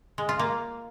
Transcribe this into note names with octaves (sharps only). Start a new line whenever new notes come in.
G#3
F4
A#3